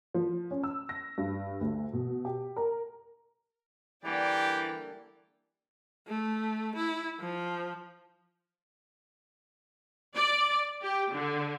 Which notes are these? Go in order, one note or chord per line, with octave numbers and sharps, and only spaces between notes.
F3
C#4
E6
A#6
G2
D2
B2
G4
A#4
D3 E3 G3 A#3 G4 D5 G5
A3
E4
F3
D5
G4
D3